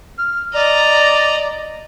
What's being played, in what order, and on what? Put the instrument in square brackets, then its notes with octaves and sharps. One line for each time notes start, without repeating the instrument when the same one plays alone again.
[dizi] F6
[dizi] D5 [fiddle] D#5 A#5